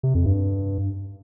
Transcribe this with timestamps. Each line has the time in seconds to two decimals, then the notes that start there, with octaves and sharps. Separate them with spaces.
0.03 C3
0.15 F2
0.26 G2